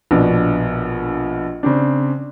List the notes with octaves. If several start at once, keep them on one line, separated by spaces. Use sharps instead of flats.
A#1 B2 D4
C#3 C4 D4